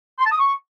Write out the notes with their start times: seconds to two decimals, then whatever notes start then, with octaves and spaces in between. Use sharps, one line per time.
0.19 C6
0.26 A5
0.32 D#6
0.39 C#6